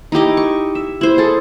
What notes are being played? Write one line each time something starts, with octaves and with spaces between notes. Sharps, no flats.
D#4 E4 G4 D#5
C#6
E5
E4 C5
G#4 A4